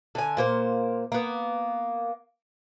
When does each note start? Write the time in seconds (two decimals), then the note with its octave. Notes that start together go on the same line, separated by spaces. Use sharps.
0.15 D3 G#5
0.37 A#2 A#3 C5
1.12 A#3 B3